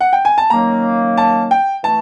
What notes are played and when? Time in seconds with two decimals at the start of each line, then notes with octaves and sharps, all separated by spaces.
0.01 F#5
0.13 G5
0.25 G#5
0.38 A5
0.50 D#3 F#3 A#3 C#4 A#5
1.18 A5
1.51 G5
1.84 E3 A3 A5